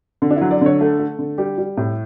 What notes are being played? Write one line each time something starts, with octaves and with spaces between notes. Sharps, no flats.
D3
D4
E4
F#3
D5
D3 C#5
A3 A4
A3
D3
G3 G4
G3
A2